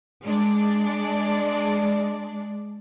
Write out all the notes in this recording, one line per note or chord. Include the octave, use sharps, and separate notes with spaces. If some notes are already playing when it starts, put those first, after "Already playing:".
G#3 D4 D5